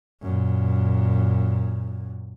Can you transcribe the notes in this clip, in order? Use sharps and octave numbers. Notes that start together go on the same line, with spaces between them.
F#2 A#2